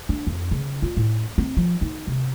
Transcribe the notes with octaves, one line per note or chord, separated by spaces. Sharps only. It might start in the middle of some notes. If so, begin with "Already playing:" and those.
D4
F2
C#3
F4
A2
C4
F3
D#4
C3